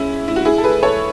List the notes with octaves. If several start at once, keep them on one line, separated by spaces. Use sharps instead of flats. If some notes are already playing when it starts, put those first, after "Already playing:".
Already playing: C#4 E4 G#4
E4
F#4
E4 G#4
A4
G#4 B4
A4 C#5